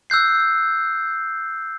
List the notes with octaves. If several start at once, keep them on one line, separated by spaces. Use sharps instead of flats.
E6 F#6 G6 C7